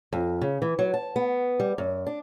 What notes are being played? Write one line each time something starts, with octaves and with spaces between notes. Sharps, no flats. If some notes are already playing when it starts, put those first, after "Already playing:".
F2
C#3
E3
F#3
A5
B3
G3
F#2
D4